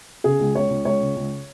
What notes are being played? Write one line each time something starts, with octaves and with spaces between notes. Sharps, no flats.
C#3 G#4
C#2
C#2 C#5
C#2
C#2 C#5
C#3
C#2